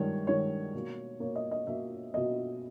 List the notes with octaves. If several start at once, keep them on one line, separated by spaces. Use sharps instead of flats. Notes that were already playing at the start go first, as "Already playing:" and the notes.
Already playing: G2 D#3 G#3 C#5
G2 D#3 G#3 C#5
B2 A#3
B2 A#3 C#5
D#5
D#5
B2 A#3 E5
B2 A#3 D#5